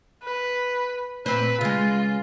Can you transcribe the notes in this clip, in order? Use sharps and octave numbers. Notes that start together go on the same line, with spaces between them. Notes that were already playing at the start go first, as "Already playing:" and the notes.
B4
A#2 C4 B4 C5
C#3 G#3 F4